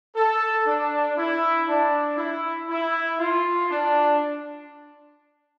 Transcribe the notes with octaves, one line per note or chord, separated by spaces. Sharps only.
A4
D4
E4
D4
E4
E4
F4
D4